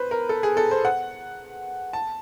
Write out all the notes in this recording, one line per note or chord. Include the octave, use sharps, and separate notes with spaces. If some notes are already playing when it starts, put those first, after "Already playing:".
Already playing: B4 C5
A#4
A4
G#4
A4
C5
F#5
A5